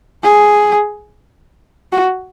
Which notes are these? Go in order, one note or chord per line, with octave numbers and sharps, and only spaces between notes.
G#4
F#4